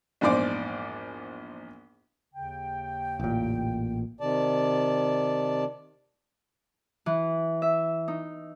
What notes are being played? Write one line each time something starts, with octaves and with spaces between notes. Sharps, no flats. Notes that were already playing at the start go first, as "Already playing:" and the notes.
A#1 E2 G#2 C5 D5
D#2 C#3 G5
A1 A#2
C3 D#3 D5 A5
E3
E5
D#4